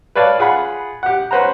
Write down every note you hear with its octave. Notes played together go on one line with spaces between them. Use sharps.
B4 C#5 D5 F5 A5
F4 G#4 F#5 B5
G4 F#5
C#4 B4 C5 F#5 A#5